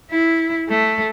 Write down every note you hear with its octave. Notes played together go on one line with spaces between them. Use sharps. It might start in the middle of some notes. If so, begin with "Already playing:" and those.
E4
A3